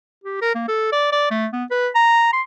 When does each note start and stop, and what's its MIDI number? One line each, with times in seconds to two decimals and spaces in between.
0.24 0.38 67
0.41 0.52 70
0.55 0.67 58
0.68 0.90 69
0.92 1.10 74
1.12 1.27 74
1.31 1.47 57
1.53 1.64 59
1.71 1.88 71
1.95 2.28 82
2.33 2.42 84